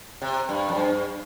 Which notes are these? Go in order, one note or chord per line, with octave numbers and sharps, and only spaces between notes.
C3
G2
F2
G2